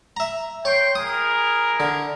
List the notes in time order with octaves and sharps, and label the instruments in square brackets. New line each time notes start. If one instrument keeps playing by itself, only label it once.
[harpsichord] E5 A#5
[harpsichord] C#5 [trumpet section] G5 C6
[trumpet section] E4 G#4 A#4 [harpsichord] D#6
[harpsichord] D3